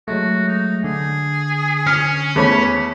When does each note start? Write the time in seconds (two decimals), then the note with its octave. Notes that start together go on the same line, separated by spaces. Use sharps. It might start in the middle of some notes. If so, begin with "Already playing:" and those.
0.08 F#3 G#3 A3 F#4
0.47 D#4
0.84 D3 G#4
1.87 C#4 F6
2.36 E2 A3 C#5 B5